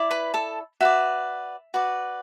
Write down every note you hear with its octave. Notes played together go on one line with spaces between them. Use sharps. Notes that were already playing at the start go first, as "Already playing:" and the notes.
Already playing: E4 D5
B4 B5
A4 A5
F#4 B4 D5 E5
F#4 B4 D5